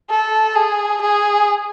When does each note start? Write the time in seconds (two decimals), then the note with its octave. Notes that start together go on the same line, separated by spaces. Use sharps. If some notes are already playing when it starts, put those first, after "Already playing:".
0.10 A4
0.55 G#4
1.02 G#4